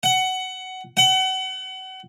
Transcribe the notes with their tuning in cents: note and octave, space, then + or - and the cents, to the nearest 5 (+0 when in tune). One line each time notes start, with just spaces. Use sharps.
F#5 +15
F#5 +30